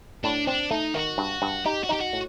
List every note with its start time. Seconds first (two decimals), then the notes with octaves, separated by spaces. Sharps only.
0.24 A2 D4
0.47 C4 D4
0.71 A3 D#4
0.94 D#3 F#4
1.18 G2
1.42 G2
1.66 D#4 G4
1.84 F#4
1.89 D#4 G4
2.01 F#4
2.13 A2